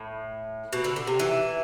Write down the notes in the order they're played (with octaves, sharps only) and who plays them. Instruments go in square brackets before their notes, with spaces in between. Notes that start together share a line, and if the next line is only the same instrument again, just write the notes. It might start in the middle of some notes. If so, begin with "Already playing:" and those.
Already playing: [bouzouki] A2
B2
D3
D3
C3
E3